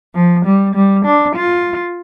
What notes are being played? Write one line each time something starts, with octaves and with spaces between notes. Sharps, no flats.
F3
G3
G3
D4
F4